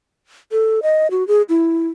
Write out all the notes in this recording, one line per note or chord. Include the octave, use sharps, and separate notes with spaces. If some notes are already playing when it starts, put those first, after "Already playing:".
A4
D#5
F#4
G#4
E4